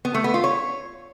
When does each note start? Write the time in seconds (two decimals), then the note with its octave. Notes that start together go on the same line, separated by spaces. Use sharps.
0.05 B3
0.14 A3
0.24 B3
0.34 F4
0.44 C#5